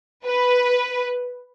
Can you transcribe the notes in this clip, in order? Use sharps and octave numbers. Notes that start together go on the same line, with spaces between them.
B4